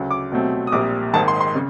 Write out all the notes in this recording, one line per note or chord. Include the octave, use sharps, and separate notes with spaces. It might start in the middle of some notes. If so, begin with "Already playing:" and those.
Already playing: D2 C#3 F#3
D6
C2 B2 F#3 A3 C4
D#6
A#1 A#2 G3 C4 D6
G#1 G#2 D#3 A5
C6
C6
C#3